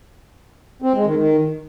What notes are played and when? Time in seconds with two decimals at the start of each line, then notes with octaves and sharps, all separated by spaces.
0.82 C4
0.94 G#3
1.05 D#3
1.17 D#3